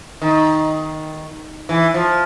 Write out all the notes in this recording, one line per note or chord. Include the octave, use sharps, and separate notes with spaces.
D#3
E3
F3